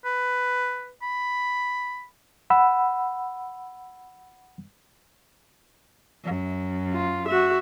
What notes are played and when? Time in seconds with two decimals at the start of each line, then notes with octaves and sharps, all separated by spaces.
0.05 B4
1.02 B5
2.50 F#5 B5 E6
6.24 F#2
6.94 F4
7.28 F#4 E5